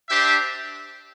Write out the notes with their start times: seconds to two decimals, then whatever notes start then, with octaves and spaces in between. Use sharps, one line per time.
0.09 D4 G4 C5 E5